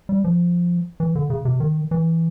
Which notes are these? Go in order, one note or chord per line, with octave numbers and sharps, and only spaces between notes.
G3
F3
E3
D3
C#3
C3
D#3
E3